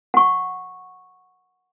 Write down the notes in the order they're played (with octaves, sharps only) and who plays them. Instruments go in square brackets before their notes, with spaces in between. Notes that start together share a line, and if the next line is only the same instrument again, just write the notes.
[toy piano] F#5 C#6